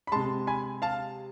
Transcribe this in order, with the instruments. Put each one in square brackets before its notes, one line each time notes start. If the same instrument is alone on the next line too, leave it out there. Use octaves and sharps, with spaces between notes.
[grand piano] B5
C3 G#3 A5 C6
G#5 B5
F5 A5